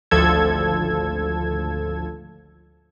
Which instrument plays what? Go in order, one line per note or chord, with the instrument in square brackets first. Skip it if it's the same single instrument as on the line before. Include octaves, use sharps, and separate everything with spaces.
[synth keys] G#1 D2 F3 A4 E6 G#6